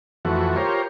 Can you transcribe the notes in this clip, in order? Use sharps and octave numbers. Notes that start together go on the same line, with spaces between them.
F2 E3 A3 F#4
F4 G4 A#4 C5 C#5